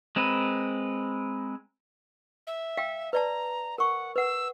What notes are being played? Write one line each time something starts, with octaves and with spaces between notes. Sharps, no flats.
G#3 C4 A#4 B4
E5
F5 G5 E6
B4 D5 A5 A#5
A#4 F#5 C#6
B4 F#5 E6